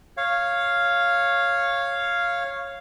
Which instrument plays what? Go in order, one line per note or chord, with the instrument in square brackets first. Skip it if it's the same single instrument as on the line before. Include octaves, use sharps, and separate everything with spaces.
[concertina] C#5 F5